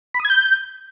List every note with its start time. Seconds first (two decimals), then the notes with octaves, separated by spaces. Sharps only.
0.14 B5
0.20 D#6
0.25 G#6
0.30 G6